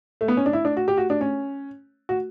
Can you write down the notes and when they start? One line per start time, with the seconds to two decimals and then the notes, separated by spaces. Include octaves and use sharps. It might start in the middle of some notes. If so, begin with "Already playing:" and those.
0.21 A3
0.28 B3
0.37 C#4
0.46 D4
0.53 E4
0.65 D4
0.77 F#4
0.88 G4
0.98 F#4
1.10 D4
1.21 C#4
2.09 F#4